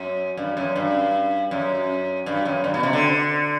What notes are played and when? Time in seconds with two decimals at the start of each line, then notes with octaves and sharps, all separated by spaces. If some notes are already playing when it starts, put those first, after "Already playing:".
Already playing: F#2
0.37 G2
0.57 F#2
0.76 G2
1.51 F#2
2.26 G2
2.45 F#2
2.64 G2
2.74 B2
2.83 C3
2.93 D3